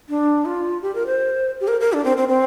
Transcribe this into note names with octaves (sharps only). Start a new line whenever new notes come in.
D4
F4
G4
A#4
C5
G4
A#4
A#4
D4
C4
C4
C4